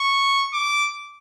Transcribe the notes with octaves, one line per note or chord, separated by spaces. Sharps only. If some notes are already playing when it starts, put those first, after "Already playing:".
Already playing: C#6
D6